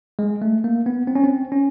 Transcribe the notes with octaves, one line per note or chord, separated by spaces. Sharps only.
G#3
A3
A#3
B3
C4
C#4
C4
C#4